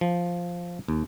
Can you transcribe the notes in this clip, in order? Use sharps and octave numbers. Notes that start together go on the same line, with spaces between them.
F3
D#2